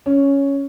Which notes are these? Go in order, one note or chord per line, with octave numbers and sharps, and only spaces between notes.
C#4